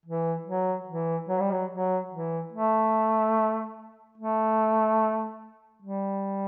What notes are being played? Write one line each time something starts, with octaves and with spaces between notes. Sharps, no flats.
E3
F#3
E3
F#3
G3
F#3
F#3
E3
A3
A3
G3